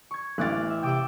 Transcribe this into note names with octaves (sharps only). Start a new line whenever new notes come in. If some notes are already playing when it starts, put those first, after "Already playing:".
C#6 G#6
A1 E3 F5 D6 F#6 A6
E5
C3 G5 D6 E6